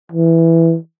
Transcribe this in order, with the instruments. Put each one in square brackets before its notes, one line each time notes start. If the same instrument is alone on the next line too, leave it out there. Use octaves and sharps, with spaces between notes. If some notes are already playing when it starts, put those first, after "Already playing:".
[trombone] E3